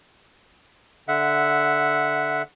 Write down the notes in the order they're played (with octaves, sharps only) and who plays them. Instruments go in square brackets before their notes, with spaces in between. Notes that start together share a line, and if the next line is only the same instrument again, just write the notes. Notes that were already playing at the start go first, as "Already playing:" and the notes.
[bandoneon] D3 E5 F#5